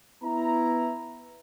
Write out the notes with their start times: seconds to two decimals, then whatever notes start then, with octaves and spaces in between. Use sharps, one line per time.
0.23 B3 E4 A#5